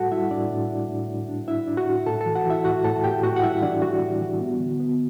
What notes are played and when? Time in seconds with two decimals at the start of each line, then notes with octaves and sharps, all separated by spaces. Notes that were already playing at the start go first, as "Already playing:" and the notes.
Already playing: A2 G3 F#4 A4 F#5 A5
0.11 G3 E4 E5
0.31 A2 D4 D5
0.50 A2
0.70 D4
0.89 A2
1.08 A2
1.29 D4
1.48 D4 E4 E5
1.68 D4
1.77 F#4 F#5
1.87 A2
2.06 A2 A4 A5
2.21 A4 A5
2.26 E3
2.36 F#4 F#5
2.46 E3 E4 E5
2.65 A2 F#4 F#5
2.84 A2 A4 A5
3.04 A2 G4 G5
3.23 A2 F#4 F#5
3.36 F#5
3.43 G3 E4 E5
3.62 E3 D4 D5
3.82 G3 F#4
4.01 A2
4.21 E3
4.41 B3
4.60 D3
4.80 B3